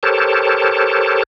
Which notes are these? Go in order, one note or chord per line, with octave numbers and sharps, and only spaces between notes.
G4 A4 A#4 C5 C#5 A5